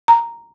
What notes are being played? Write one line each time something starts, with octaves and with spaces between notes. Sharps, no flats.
A#5